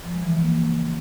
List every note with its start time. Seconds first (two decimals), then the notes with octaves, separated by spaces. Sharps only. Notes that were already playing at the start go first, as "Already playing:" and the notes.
0.04 F3
0.13 G#3
0.22 E3
0.32 C#3
0.41 A#3